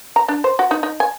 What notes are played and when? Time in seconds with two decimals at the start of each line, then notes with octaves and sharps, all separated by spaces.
0.16 A#5
0.28 D4
0.44 C5
0.59 F#4
0.71 D#4
0.83 D#4
1.00 G#5